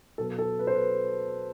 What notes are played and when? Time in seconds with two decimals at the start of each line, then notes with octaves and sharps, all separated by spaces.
0.18 B2 F#3 A4
0.39 A4
0.59 B4
0.67 C5
0.74 B4